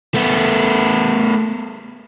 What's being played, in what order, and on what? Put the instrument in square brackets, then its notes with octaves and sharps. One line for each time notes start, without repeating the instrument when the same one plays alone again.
[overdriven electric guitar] A3 B3